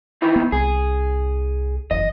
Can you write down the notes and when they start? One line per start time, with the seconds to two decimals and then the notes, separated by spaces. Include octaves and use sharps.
0.22 D#3 E3 E4
0.36 B3
0.52 C2 G#4
1.91 F#1 E2 D#5